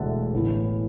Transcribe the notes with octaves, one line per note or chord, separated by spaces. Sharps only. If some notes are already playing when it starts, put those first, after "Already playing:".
Already playing: E1 D2 D3 E5 F#5 A5
A1 A2 E3 B3